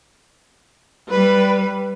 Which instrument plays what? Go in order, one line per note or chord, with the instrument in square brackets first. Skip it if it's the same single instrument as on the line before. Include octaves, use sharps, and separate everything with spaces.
[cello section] G3 [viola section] B4